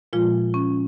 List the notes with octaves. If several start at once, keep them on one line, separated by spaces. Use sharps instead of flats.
A#2 F3 G#3 F4
C#4